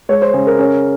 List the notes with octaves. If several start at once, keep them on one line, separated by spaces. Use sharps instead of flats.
G#3 C#5
C5
C#3 G#4
A#4
C#4